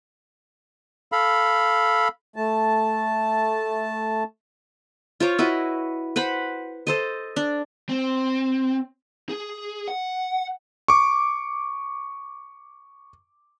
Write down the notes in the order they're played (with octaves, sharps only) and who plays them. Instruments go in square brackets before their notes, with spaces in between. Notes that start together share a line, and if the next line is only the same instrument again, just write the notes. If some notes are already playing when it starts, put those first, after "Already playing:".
[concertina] A4 F5 B5
[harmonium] A3 A5
[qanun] F4 C5 C#5 D6
E4 F#4 B4 D#5
B4 C5 F#5 B5
A4 C5 D#5
D4
[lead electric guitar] C4
G#4
F#5
[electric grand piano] C#6 D6